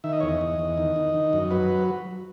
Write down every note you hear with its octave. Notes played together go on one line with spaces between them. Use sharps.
D#3 E5
D#5
E2 C#5
D#5
E2
E2
D#3
D#3
D#3
F#2
F#3 B4